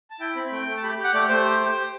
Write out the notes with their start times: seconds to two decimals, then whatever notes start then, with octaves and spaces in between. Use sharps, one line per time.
0.10 A5
0.20 E4 G5
0.36 C4 B5
0.52 A3 G5
0.67 A3
0.77 A5
0.83 G4 B5
0.99 G4
1.04 F#5
1.14 A3 D5
1.29 A3 C5
1.44 G4
1.61 G4
1.76 G4